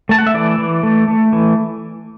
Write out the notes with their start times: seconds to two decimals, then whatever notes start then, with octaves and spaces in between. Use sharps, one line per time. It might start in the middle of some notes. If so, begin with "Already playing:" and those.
0.09 A3 A5
0.18 F#5
0.27 E5
0.34 E3 D5
0.58 E3
0.83 A3
1.08 A3
1.33 E3